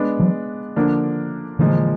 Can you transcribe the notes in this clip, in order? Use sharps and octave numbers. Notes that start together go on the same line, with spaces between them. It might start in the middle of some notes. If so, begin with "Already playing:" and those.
Already playing: G#3 B3 D4
E3 F#3
D3 F3 A#3 D4
A#2 D3 E3 F3 G#3